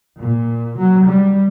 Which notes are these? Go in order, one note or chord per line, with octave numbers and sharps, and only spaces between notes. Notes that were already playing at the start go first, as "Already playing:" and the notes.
A#2
F#3
G3